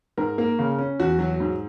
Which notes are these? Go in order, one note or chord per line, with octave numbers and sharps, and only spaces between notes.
G#2 A#4
A#3
C#3
C#4
E2 F#4
F#3
G#2